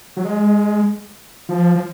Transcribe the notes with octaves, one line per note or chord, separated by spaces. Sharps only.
F#3
G#3
F3
F3